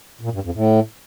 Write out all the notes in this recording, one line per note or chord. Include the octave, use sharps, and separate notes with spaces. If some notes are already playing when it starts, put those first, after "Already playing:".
A#2
G2
F2
A2